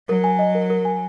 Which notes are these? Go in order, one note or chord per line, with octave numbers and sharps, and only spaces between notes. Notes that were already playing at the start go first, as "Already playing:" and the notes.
F#3 A#4
G#5
D#5
A#4
A#4
G#5